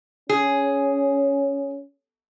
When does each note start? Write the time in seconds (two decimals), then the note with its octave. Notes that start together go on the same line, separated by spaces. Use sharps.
0.29 C#4 G#4